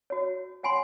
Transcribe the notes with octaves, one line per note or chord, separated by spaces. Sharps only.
F#4 C#5
C#5 F#5 G#5 B5 C6